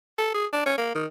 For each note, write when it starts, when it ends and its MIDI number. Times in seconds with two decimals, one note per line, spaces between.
0.18 0.34 69
0.35 0.46 68
0.53 0.62 62
0.66 0.77 61
0.78 0.92 58
0.95 1.06 51